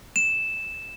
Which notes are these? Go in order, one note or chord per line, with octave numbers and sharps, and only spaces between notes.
E7